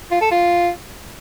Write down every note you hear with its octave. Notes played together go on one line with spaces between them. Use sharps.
F4
A4
F4